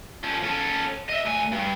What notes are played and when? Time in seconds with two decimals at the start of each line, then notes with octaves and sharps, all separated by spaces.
0.24 F3 C#4
0.44 C#4 A4
1.09 D#5 E5
1.25 D2 G#5
1.52 G2